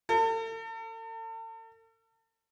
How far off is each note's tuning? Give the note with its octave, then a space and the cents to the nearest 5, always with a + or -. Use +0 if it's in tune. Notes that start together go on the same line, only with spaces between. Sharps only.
A4 +40